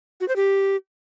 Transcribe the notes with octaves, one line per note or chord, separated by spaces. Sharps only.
F#4
C5
G4